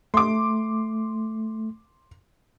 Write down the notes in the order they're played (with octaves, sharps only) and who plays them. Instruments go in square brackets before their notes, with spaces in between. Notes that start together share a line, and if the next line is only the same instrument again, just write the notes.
[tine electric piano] A3 [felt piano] C6 D6